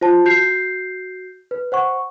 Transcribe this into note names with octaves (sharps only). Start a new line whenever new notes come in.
F4 C5 A5
F#4 G6 C7
B4
C5 F#5 C#6